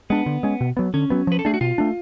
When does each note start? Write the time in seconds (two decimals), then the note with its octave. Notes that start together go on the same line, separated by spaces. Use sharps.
0.10 G#3 B3 D4
0.26 D3
0.43 G#3 C#4
0.61 B2
0.77 F#3 B3
0.94 D3 C#4
1.10 F#3 B3
1.27 F3 B4
1.39 A4
1.45 A3 D4 G#4
1.54 F#4
1.61 B2 F4
1.78 A3 D4